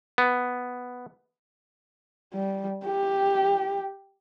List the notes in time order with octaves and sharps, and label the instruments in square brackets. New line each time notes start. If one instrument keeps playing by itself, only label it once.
[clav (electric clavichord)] B3
[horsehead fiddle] G3
G4